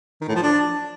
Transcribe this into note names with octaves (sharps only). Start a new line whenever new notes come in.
D#3
A2
F3
D4